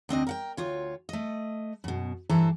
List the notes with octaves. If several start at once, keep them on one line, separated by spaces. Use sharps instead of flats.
D2 C4 D4 D#5
A#4 F#5 G5
D2 F4 C#5
A3 D#5
F#2 B2
G2 E3 A4 C5 A5 A#5